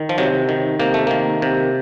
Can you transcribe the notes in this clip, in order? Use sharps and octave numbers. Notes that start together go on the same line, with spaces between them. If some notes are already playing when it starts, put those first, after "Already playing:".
Already playing: D#3
F3
C3 F#3
D#3
C3 A#3
A3
D#3 A#3
C3